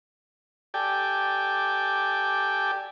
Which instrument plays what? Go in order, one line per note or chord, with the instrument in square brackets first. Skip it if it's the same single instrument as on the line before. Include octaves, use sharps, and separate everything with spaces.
[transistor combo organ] G4 A4 D5 G5 G#5